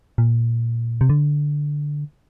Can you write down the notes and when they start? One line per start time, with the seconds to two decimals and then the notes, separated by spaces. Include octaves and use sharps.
0.18 A#2
1.01 C3
1.09 D3